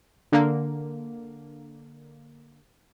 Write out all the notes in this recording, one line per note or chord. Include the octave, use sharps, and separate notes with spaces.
D3 A#3